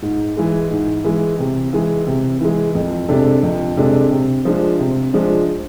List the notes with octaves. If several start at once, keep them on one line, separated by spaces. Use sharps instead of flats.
G#2
E3 G#3
G#2
E3 G#3
C3
E3 G#3
C3
E3 G#3
F2
C3 G#3 D4 A4
F2
C3 G#3 D4 A4
C3
F3 G#3 D4
C3
F3 G#3 D4